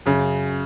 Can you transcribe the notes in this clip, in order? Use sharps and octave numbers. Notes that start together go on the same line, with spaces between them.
F#2 C#3